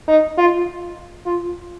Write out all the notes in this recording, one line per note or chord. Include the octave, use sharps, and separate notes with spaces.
D#4
F4
F4